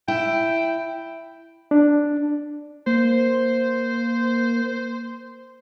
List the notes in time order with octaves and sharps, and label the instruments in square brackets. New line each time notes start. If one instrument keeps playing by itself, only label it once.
[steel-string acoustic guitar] E4 [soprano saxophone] G5
[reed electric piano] D4
[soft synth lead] A#3 [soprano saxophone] C5